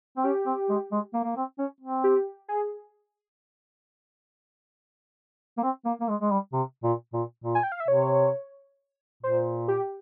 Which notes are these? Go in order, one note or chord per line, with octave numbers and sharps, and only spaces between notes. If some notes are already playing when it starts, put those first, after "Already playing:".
C4
C#4 G4
C4
G#3
G#3
A#3
A#3
C4
C#4
C4
G4
G#4
A#3
C4
A#3
A#3
G#3
G#3
G3
C3
A#2
A#2
A#2
G#5
G5
F5
E5
C3 C#5
A#2 C5
G4